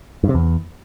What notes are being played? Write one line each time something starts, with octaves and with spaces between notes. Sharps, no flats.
G2
C3
E2